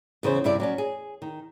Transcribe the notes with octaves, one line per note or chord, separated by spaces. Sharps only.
E2 C#3 B4 C5
G2 C3 E4 D5
F#3 C#4 D5
G#4
D#3